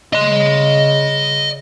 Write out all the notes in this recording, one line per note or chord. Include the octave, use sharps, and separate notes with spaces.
C#3 D#5 C6